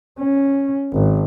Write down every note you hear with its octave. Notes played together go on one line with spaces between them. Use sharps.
C#4
G#1